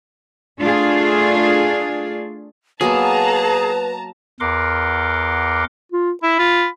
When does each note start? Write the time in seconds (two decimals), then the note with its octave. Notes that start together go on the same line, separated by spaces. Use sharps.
0.60 A3 D4 F4 G#4
2.81 F#3 A#3 B3 G#4 B4 A5 A#5
4.40 E2 A#4 F#5 C6 D6
5.92 F4
6.23 E4 B5
6.39 F4